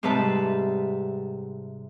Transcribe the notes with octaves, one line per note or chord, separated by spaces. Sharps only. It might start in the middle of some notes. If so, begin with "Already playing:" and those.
G#2 C3 G3 B4 E5 A5